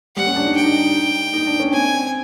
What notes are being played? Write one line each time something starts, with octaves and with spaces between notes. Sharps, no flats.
G3 F#5
C#4
D4
D#4
G5
D#4
D#4
D4
C#4
C4 G#5